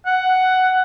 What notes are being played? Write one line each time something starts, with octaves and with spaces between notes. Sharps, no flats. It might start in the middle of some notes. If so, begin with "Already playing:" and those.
F#5